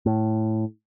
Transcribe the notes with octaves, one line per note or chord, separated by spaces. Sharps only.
A2